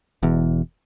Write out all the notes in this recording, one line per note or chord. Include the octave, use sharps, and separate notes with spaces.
E1 E2